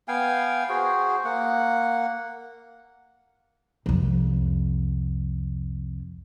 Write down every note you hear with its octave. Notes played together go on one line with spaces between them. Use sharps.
B3 F5 G5 G#5
F#4 G#4 C5
A#3 F#5
C2 F2